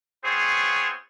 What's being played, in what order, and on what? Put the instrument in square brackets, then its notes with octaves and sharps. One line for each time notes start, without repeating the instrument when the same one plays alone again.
[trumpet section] B3 C4 F4 G#4 C5 C#5